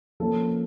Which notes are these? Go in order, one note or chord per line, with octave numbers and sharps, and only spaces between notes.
F3 A#3 C#4 A4